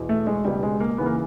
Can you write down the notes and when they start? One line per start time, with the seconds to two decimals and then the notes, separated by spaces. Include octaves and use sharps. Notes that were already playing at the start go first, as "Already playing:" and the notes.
Already playing: E2 B2
0.09 A3
0.27 G#3
0.45 C#2 B2 G3
0.63 G#3
0.80 A#3
0.98 D#2 C#3 E3 B3
1.06 A#3